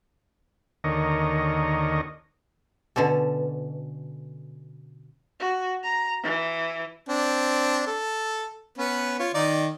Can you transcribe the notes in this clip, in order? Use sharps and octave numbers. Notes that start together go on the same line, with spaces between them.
D#2 D3 A#4 C#5 D#5
B2 D3 C#4 A4
F#4
A#5
E3
C4 D4
A4
B3 C#4 B4
F4 C#5
D#3 D#4 D5